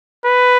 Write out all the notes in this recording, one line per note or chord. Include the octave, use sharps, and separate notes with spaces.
B4